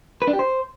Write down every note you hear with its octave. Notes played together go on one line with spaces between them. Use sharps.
B4
D4
G4
C5